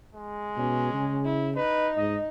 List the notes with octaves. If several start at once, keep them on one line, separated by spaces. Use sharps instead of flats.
G#3
B2 C#4
C#3
E4
D#4 B4
G#2 D#5